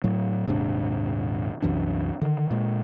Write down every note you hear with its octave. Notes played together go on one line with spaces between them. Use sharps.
A2 F#3
D#1 G#2 C3 D4
C2 F#2 E3 D4
D3 D#3
A#2 G#3